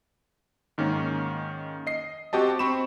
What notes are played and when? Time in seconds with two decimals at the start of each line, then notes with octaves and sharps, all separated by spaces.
0.78 G#2 D#3 A#3 C#4
1.87 D#5 C7
2.33 C4 F#4 G4 D#5 A5
2.59 C4 B5 C#6 E7